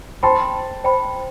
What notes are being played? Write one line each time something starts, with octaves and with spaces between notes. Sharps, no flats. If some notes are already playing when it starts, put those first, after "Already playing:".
C5 G5 A5 B5 C6
C5 G5 B5